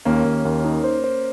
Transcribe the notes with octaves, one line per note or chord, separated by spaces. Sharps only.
D#2 A#3 C#4
D#2
D#2
D#4
C5
C5